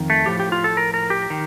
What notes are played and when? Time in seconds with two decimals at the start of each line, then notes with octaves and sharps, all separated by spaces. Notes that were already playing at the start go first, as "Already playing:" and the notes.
Already playing: F2 D#3
0.10 A3
0.26 A2 F3 G4
0.40 G4
0.52 F4
0.64 A4
0.77 A#4
0.94 A#4
1.10 G4
1.30 D#3